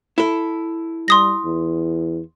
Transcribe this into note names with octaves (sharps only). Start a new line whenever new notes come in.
E4 A4
G3 C6 D#6 A#6
E2